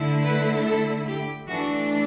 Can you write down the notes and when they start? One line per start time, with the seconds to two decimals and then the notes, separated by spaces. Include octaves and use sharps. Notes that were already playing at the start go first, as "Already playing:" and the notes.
Already playing: D3 A3 E4
0.24 B4
0.65 A4
1.07 G4
1.48 E3 A3 D4 F#4